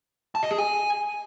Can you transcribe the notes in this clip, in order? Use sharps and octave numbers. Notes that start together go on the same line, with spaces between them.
A5
D#5
G#4
G#5